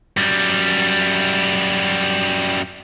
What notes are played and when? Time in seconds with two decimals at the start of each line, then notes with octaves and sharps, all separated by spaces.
0.17 F#2 G3